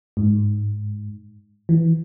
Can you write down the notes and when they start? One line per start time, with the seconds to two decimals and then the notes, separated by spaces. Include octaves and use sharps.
0.17 G#2
1.69 E3